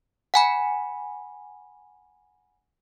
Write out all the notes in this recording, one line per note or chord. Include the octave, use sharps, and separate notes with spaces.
F#5 G#5 B5